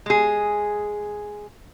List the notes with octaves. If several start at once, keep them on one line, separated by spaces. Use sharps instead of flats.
G#3 G#4